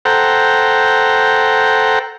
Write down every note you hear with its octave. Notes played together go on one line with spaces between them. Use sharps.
A4 C5 F#5 G5 A#5